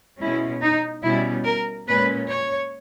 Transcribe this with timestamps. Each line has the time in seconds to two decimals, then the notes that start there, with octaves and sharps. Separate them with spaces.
0.20 B2 G#3 C#4 E4
0.62 D#4
1.04 B2 G3 C#4 E4
1.45 A#4
1.88 A#2 G#3 C#4 B4
2.29 C#5